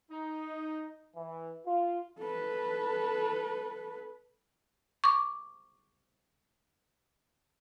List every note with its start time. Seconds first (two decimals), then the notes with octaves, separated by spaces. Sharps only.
0.10 D#4
1.16 E3
1.66 F4
2.20 A4 B4
5.04 C#6 D6